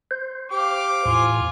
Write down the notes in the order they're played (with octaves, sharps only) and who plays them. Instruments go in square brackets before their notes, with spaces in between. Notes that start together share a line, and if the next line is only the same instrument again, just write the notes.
[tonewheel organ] C5
[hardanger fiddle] G4 F5 [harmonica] D6
[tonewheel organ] E2 A2 [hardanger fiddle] F4 G#5